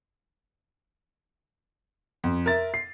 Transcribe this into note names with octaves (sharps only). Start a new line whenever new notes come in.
F2
A#4 E5 A6
C7